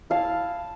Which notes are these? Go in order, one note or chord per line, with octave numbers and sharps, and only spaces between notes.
E4 F5 A5